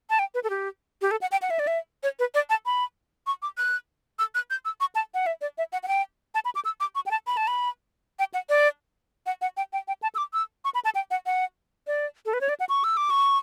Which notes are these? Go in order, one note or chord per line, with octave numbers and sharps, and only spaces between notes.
A5
G5
B4
A4
G4
G4
A4
F#5
G5
F#5
E5
D5
E5
C#5
B4
D5
A5
B5
C#6
D6
F#6
E6
F#6
G6
E6
C#6
A5
F#5
E5
D5
E5
F#5
F#5
G5
A5
B5
D6
E6
D6
C#6
G5
A5
B5
A5
B5
G5
F#5
D5
F#5
F#5
G5
G5
G5
A5
E6
D6
E6
C#6
B5
A5
G5
F#5
F#5
D5
A4
B4
C#5
D5
F#5
C#6
E6
D6
C#6